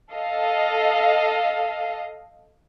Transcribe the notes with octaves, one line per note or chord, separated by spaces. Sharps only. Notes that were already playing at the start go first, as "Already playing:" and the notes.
A4 D#5 F5